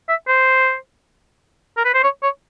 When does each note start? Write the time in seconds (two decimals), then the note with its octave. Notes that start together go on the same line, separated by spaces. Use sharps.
0.09 E5
0.28 C5
1.77 A#4
1.85 B4
1.94 C5
2.04 C#5
2.23 C#5